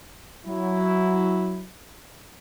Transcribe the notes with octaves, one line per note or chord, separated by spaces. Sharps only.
F#3 E4